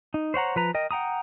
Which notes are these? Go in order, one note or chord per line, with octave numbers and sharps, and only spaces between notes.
D#4
C5 C#5 F#5 A#5
F3 B4 A#5
A#4 D#5 G5
F#5 G5 A#5 D#6